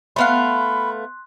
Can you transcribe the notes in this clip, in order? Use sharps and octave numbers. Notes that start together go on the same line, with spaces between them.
A3 B3 F5 B5 C6 F#6